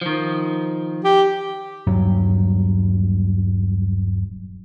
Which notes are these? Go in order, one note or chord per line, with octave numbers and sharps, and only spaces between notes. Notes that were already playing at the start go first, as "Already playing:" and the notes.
D#3 F3
G4
D#1 G2 F#3